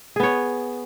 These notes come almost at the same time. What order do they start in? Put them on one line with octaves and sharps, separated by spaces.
G#4 B3 C#5